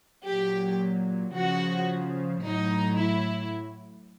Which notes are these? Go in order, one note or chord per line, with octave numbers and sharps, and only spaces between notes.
A#2 F#3 G4
C#3 F3 F#4
A2 F#3 D#4
E4